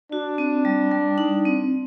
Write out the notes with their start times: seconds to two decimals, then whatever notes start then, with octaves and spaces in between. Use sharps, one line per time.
0.11 D4 F#4
0.38 C4
0.65 G3
0.91 G3
1.18 D#4
1.45 C4